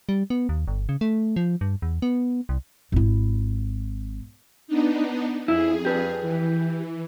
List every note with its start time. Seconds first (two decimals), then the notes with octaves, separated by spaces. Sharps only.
0.09 G3
0.30 B3
0.49 D#2
0.68 G1
0.89 C#3
1.01 A3
1.36 F3
1.61 G2
1.82 E2
2.02 B3
2.49 C2
2.92 G#1 E4
4.68 B3 D4 D#4
5.48 F2 E4 G#4
5.85 G4 B4
6.21 E3